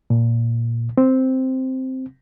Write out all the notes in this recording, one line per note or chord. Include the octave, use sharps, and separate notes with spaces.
A#2
C4